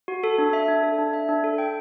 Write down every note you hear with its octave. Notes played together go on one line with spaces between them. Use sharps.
F#4
A4
D4
E5
D4
A4
D4
E5
D4
A4
G5